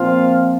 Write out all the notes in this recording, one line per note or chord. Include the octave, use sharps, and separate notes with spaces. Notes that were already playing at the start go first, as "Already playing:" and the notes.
Already playing: A#2 F3 C4 F4 F5